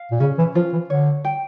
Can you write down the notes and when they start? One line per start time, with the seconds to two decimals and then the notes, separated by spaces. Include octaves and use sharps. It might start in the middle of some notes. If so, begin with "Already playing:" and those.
Already playing: F5
0.11 A#2
0.20 C#3 C#4
0.38 E3
0.55 F3 F4
0.73 E3
0.89 D3 C#5
1.25 G5